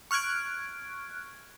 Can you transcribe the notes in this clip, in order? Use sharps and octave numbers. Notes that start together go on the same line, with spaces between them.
C#6 F6 F#6 G#6 D7